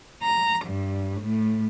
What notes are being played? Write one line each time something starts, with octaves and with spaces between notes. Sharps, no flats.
A#5
G2
A2